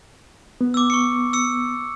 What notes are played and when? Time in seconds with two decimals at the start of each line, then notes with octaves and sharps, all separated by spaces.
0.61 B3
0.74 D6 E6
0.90 C#6 C#7
1.33 E6 C#7